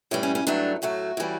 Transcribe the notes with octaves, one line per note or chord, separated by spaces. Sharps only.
A2 E3 G3 C#4
C#4
C#4
G2 F#3 A3 D4
A2 F#3 A3 F#4
A2 E3 G3